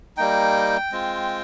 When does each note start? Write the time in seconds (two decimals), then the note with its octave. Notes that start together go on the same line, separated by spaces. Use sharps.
0.17 G3 A#3 D#4 G5
0.92 G#3 C4 F4